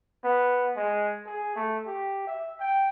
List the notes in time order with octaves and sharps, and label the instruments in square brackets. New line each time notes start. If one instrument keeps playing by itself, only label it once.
[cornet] B3
G#3
G#4
A3
G4
E5
G5